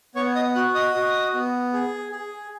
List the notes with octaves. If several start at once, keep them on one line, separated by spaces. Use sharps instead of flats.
B3 C#5 C#6
D#5 D#6
F#4 F#5 F#6
D#5 D#6
F#4
B3
G#4
G#4